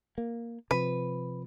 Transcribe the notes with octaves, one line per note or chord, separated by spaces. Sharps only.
A#3
C3 F3 B4